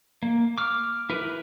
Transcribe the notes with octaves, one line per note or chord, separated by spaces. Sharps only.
A#3
D6 F6
E4 A#4 B4